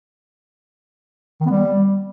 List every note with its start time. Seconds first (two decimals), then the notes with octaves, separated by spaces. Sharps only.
1.41 D#3
1.46 B3
1.51 G3